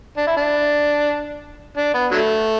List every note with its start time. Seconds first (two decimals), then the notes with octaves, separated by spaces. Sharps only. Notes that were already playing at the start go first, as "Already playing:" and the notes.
0.17 D4
0.27 E4
0.37 D4
1.77 D4
1.94 B3
2.12 D3 F#3 A3